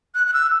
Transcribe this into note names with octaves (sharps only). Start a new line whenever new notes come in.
F#6
F#6
E6